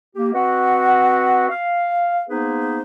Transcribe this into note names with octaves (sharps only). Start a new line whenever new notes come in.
A#3 G4
C4 F#4 B4 D#5 F#5
F5
A#3 B3 D#4 G#4 B4 C5